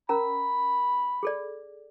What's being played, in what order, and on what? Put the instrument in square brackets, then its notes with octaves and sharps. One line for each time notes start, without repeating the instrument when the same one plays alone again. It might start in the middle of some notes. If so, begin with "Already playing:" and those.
[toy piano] C#4 A#4 A#5 [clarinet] B5
[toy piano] G#4 A4 D5